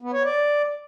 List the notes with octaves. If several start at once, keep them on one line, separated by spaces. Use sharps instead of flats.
B3
C#5
D5